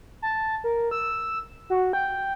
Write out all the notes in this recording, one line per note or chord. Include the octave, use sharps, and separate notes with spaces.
A5
A#4
E6
F#4
G5